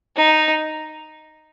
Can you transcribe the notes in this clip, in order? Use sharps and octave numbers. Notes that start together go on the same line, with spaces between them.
D#4